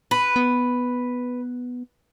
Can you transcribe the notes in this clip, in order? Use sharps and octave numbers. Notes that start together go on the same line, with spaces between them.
B4
B3